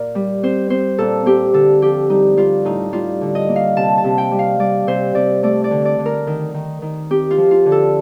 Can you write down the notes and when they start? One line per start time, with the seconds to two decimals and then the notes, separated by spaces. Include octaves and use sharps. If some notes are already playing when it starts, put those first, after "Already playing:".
Already playing: A#2 A#3 A#4 D5
0.15 G3
0.43 C4 C5
0.70 C4 C5
0.98 A#2 A4
1.26 C4 G4
1.54 D3 A4
1.82 F3 G4
2.09 G3 D#4
2.37 G3 F4
2.65 A2 D#4
2.92 G3 F4
3.21 D3
3.35 D#5
3.48 A#3
3.56 F5
3.76 C3 A5
3.98 A5
4.04 C3
4.18 G5
4.31 G3
4.39 F5
4.59 G3 D5
4.87 C3 C5
5.15 C3 D5
5.43 A3 D5
5.64 D5
5.71 D3
5.85 D5
5.99 D3
6.06 A#4
6.27 D#3
6.54 D#3
6.82 D#3
7.10 C4 G4
7.31 F4
7.38 F3
7.51 F4
7.66 D3
7.72 A4